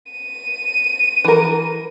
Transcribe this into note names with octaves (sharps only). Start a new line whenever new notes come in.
D#7
E3 A#4